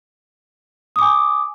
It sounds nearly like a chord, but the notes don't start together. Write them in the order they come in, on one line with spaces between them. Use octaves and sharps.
D#6 D6 G#5